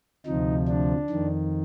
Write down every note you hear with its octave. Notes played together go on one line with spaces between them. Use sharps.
D2 C3 F3 D#4
D4
F2 D#3